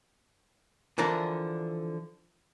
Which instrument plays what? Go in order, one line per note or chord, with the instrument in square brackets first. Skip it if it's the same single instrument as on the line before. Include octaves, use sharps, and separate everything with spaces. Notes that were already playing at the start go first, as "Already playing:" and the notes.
[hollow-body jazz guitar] D3 E3 F3 D4 A#4